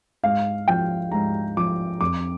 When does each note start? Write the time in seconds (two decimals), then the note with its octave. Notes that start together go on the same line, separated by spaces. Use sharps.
0.23 G#2 F5
0.68 F3 G5
1.12 G#2 A#5
1.57 F3 D6
2.01 F2 D6